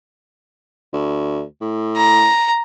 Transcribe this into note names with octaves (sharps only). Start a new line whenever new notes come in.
D2
A2
A#5